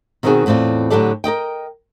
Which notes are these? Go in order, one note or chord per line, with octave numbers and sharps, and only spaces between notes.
B2 D#3 C4 C#4 F#4 G#4
E2 A2 C4 F4 D5
A2 D3 F#3 G4 A4 D5
A#4 D5 D#5 G5